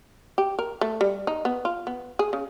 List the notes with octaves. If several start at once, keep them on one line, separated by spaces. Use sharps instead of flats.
G4
A#4
A3
G3
D#4
B3
F4
B3
G#4
C#3